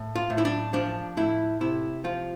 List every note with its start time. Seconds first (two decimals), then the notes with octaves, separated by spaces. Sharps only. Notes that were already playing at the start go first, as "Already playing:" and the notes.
Already playing: A2
0.15 F4
0.30 A2
0.38 E4
0.45 D4
0.73 F3 D4
1.17 A2 E4
1.61 C3 E4
2.04 F3 F4